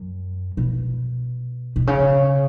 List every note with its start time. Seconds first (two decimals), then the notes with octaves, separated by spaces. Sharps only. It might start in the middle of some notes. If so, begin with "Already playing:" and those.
Already playing: F#2
0.57 B2
1.76 B2
1.87 C#3